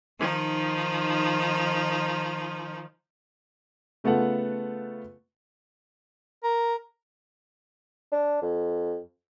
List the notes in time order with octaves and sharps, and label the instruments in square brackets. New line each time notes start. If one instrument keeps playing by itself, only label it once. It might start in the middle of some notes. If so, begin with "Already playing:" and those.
[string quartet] D#3 F3 D#4
[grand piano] C#3 A3 B3 F4 A4 F#5
[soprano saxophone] A#4
[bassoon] D4
F2